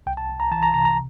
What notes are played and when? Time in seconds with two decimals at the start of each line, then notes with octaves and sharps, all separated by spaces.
0.07 C2 G5
0.17 A5
0.29 C2
0.40 A#5
0.51 E3 A5
0.63 A#5
0.74 C3 A#5
0.85 A#5